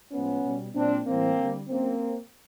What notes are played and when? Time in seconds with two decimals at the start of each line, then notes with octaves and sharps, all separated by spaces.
0.11 A2 F3 G#3 B3 C#4
0.43 B2 G3
0.74 A#2 F#3 C4 D4
1.06 A2 E3 G3 A#3 C4
1.38 D3 G3
1.69 C#3 F#3 A#3 C4